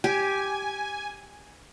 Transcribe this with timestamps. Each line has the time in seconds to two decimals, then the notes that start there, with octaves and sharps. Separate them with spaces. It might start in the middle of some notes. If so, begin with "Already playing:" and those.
0.04 G4 G#5